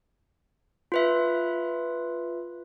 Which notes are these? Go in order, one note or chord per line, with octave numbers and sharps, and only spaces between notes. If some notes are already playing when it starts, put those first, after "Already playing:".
F4 B4 E5